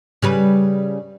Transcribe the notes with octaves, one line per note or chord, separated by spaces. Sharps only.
C#3 G3 B4